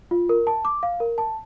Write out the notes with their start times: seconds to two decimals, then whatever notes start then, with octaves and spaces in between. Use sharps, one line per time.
0.11 F4
0.29 A#4
0.47 A5
0.65 D6
0.83 F5
1.00 A#4
1.18 A5